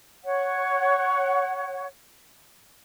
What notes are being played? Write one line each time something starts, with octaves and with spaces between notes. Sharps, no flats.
C#5 F#5